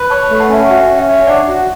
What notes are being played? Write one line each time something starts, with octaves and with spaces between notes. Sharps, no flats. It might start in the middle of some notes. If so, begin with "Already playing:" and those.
Already playing: B4
C#5 A5 C#6
A3
F#5 A5
C#4 E5
F#5
F#4 E5 G5
C#4
E5 G5
C#5
D4 D5 F#5
F#4